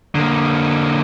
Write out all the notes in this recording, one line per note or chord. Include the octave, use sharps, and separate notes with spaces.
D3 A#3